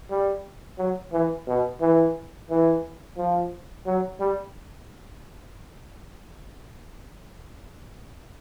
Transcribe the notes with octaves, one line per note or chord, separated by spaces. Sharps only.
G3
F#3
E3
B2
E3
E3
F3
F#3
G3